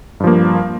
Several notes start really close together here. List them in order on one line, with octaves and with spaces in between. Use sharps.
G2 F3 A#3